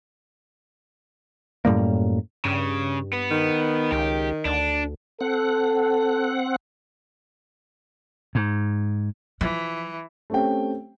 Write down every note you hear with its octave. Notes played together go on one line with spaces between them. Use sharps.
F#2 A2 G3 A#3
G2 C#3
B3
D#3
C#2 G4
D2 D4
C4 A4 F#5
G#2
E3 F3
A3 C4 C#4 G4 G5